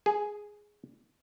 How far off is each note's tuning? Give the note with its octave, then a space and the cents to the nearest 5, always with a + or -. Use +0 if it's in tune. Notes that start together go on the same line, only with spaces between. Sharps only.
G#4 +0